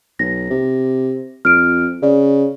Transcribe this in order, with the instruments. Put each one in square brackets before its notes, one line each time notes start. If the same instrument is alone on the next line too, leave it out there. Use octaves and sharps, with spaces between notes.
[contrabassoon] B1 [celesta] A#6
[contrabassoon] C3
[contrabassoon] F2 [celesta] F6 D7
[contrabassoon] C#3 [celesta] D5